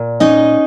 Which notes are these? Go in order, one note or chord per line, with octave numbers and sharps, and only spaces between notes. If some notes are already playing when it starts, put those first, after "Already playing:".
Already playing: A#2
C#4 D#4 D#5